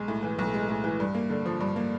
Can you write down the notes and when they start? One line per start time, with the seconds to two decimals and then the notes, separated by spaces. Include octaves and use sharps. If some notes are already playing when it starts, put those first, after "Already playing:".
Already playing: B1 G#3
0.08 A2
0.23 E3
0.39 B1
0.54 G#3
0.69 A2
0.84 E3
1.00 G2
1.15 A#3
1.30 D3
1.46 F3
1.60 G2
1.76 A#3